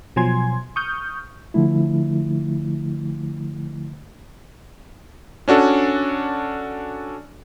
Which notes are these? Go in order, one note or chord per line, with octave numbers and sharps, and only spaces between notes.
B2 F3 F#3 G#5 C6 G#6
C#6 D#6 F6 G6
D3 F3 A3 E4
C#4 D4 F#4 A4